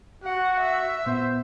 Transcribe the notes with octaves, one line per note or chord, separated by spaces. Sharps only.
F#4 F#5
E5
A#2 B3 C5